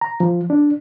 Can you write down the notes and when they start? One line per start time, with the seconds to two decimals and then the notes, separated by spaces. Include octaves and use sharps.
0.01 A#5
0.20 F3
0.50 D4